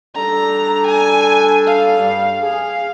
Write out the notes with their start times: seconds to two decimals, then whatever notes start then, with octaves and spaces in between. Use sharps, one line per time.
0.16 G3 D4 A4 A#5
0.87 G#5
1.67 F5
1.98 G2 G3
2.42 G#4 F5